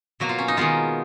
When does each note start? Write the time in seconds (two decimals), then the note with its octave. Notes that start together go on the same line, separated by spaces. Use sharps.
0.20 B2 F#3 A#3 F#4
0.29 F4
0.38 C#4
0.48 D#4
0.57 D#3 G#3 B3 F4